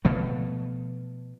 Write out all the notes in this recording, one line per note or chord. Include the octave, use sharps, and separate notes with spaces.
B2 F3 A3